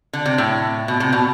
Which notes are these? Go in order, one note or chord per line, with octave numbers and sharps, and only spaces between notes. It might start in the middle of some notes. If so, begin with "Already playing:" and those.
D3
C3
A2
B2
C3
B2